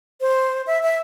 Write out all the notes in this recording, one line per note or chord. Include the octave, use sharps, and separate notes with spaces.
C5
E5
E5